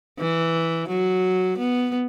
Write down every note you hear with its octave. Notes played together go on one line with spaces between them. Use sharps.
E3
F#3
B3